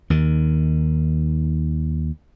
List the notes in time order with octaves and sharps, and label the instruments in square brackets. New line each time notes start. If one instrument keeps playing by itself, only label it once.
[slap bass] D#2 D#3